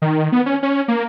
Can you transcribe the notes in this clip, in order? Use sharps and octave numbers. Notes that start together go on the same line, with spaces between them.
D#3
B3
C#4
C#4
A#3